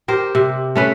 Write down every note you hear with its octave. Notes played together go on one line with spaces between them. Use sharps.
G4 A#4 C5
C3
A3 C#4 B4